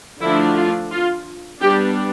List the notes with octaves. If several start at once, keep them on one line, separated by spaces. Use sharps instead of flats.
D3 F3 A3 D4 E4
F4
F4
G3 B3 D4 G4